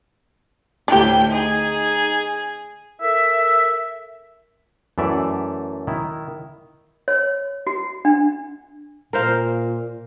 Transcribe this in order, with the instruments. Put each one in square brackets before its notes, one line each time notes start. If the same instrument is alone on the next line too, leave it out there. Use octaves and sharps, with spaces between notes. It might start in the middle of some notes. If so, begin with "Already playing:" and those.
[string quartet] D2 G5 G6 [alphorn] A2 [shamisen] D4 G4
[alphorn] D#4 [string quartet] G#4 G#5
[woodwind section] A4 A#4 E5
[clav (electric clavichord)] F#2 E3 A3 D5 E5
D#3 E4
[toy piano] C#5
F#4
D4
[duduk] A#2 [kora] A#4 C5 F5